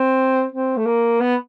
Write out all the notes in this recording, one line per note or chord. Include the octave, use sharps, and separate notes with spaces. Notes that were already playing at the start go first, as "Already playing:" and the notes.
Already playing: C4
C4
A3
A#3
B3